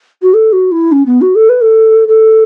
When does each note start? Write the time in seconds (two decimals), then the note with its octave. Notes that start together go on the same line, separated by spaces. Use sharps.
0.22 F#4
0.33 A4
0.52 F#4
0.71 E4
0.91 C#4
1.05 B3
1.21 F#4
1.35 A4
1.49 B4
1.61 A4
2.08 A4